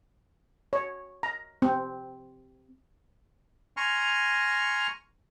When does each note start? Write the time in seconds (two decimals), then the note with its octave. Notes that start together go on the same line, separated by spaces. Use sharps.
0.73 C#5
1.23 A#5
1.62 C4
3.77 G#5 A#5 C6 C#6 F6